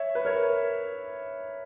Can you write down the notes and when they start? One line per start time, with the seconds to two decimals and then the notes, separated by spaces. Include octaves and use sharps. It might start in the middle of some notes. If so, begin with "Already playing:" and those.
Already playing: C#5 E5
0.15 B4
0.25 A#4 C#5